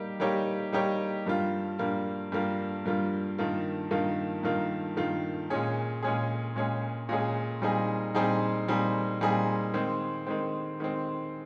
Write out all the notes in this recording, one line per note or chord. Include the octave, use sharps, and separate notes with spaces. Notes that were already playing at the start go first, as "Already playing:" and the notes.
Already playing: G3 A#3 D#4 G4
G3 A#3 D#4 G4 C#5
G3 A#3 D#4 G4 C#5
G2 G3 A#3 F4
G2 G3 A#3 F4
G2 G3 A#3 F4
G2 G3 A#3 F4
G2 D#3 A#3 F4
G2 D#3 A#3 F4
G2 D#3 A#3 F4
G2 D#3 A#3 F4
A#2 G#3 C#4 G#4
A#2 G#3 C#4 G#4
A#2 G#3 C#4 G#4
A#2 G#3 C#4 G#4
A#2 G3 C4 D#4 G#4
A#2 G3 C4 D#4 G#4
A#2 G3 C4 D#4 G#4
A#2 G3 C4 D#4 G#4
D#3 G#3 C4
D#3 G#3 C4
D#3 G#3 C4